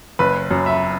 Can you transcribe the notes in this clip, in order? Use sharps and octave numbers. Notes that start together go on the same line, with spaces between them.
F#1 B4
F#2
E5